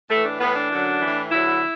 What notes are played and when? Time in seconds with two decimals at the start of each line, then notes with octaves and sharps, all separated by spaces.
0.09 A2 E3 A3
0.25 D4
0.40 A2 E3 B3
0.55 D4
0.71 F#2 D3 F#3
1.00 A2 E3
1.31 E2 D3 F#3 E4